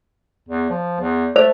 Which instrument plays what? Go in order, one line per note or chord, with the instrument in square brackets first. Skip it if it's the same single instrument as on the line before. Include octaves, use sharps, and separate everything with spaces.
[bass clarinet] E2
F3
E2
[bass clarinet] A3 [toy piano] C5